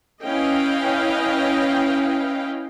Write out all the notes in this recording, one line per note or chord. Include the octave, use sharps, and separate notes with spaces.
C#4 E4 B4 D#5 F5 G5